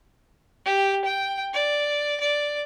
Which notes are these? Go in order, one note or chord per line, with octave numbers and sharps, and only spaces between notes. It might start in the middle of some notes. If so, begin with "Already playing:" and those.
G4
G5
D5
D5